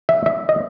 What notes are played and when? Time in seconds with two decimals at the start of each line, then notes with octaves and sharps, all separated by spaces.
0.09 E5
0.26 E5
0.49 D#5